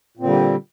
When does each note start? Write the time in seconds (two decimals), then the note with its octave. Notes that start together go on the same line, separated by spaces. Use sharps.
0.17 A#2
0.20 C4
0.23 D3
0.27 G3